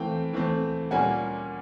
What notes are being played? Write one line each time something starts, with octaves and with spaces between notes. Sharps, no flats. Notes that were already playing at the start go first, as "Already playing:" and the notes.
Already playing: E3 A3 C4 F5 G5
E3 A3 C4
A#2 G3 A#3 C#4 F#5 G#5